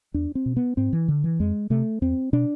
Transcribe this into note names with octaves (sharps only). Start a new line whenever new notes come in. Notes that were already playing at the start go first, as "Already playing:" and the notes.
E2 D4
C4
B2
B3
G#2 C4
E3
D3
E3
F2 G#3
C3 A3
E2 C4
B2 D4